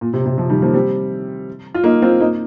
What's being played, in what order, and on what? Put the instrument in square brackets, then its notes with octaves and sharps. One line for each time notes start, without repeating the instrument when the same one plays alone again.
[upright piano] A#2
C3
C3
C3 F3
D#3 G3
F3 A#3
G3 C4
F4
A#3 D#4
C4 F4
A#3 D#4